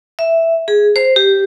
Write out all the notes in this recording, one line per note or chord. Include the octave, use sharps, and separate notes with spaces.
E5
G#4
C5
G4